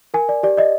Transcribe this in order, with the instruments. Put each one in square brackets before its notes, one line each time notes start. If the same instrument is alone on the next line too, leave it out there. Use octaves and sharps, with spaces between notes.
[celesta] A#4 G#5
D5
G4 D5
D5 D#5